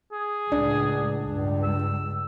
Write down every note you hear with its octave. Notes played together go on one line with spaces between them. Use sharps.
G#4
C#2 A2 D4
C#2 G2
E6